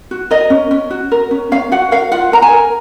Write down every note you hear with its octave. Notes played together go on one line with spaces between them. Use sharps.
F#4
A#4 D#5
C#4
C#4
F#4
A#4
C#4
C#4 F5
F#4 F#5
A#4 F5
F4 F#5
A#4 A#5
G#5
A#4